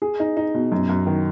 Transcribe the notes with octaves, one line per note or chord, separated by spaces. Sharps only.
G#4
D#4
D#4
B2
F#2
F#2
D#3